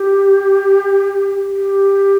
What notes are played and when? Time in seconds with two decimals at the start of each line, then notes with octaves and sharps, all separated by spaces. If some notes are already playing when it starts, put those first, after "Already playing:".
Already playing: G4
1.56 G4